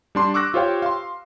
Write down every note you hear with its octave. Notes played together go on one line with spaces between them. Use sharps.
G3 D4 C6
C#6 D6 E6 F#6 A#6
F4 G4 C5 C#5 F5 G5
F5 C6